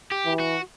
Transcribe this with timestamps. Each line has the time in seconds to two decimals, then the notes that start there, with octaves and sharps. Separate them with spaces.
0.12 G4
0.26 E3
0.40 F#4